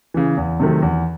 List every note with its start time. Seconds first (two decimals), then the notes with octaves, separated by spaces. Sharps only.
0.14 C#3 E3
0.37 E2
0.60 C3 D#3 F#3 A3
0.82 E2